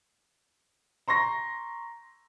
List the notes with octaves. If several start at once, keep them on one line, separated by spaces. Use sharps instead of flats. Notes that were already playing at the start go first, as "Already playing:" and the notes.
A#5 C6 C#6 A#6